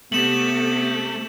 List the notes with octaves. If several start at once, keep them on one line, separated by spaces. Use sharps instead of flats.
C3 A3 B3 G4 E7 F#7